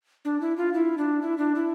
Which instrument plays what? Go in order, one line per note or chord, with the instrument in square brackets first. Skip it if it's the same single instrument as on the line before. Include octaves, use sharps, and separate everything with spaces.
[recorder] D4
E4
F4
E4
D4
E4
D4
E4